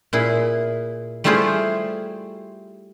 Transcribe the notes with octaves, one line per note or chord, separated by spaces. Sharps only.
A#2 E4 G#4
G3 A3 E4 F4 G#4 C5